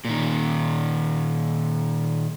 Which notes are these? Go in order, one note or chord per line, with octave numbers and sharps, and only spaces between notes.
A#2 D#3